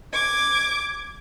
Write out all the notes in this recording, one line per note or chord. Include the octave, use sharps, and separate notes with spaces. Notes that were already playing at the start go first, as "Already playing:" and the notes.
D6 G#6